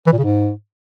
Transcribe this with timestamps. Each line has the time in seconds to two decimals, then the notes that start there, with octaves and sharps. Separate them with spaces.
0.07 E3
0.12 A#2
0.18 C#3
0.24 G#2